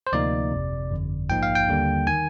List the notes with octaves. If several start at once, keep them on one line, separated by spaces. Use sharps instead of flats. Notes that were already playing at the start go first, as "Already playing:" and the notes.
C5
D2 C3 F3 A#3 D#4 D5
G1 F2 C3
G1 F2 D3
A#1 G#2 F3 A#3 D#4 G5
F5
G5
D#2 D3 G3 A#3
D#3 G#5